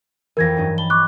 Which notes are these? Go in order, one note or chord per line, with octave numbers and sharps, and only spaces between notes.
F2 E3 A#4 G#6 A#6
G2 F#3 D#4
A5 B5 G7
C#6 D6 F#6